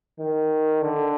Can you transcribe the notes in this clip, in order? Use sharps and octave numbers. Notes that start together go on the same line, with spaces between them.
D#3
D3